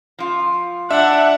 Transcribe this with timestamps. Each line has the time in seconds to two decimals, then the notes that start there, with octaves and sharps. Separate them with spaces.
0.19 F3 F4
0.91 D4 E5 F#5